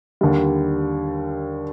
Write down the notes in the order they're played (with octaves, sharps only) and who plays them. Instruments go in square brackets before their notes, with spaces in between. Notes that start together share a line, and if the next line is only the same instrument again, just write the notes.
[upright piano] D#2 D3 G3